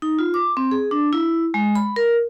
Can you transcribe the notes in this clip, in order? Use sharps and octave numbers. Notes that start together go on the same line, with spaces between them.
D#4
F4
D6
C4
G#4
D4
E4
G#3
B5
A#4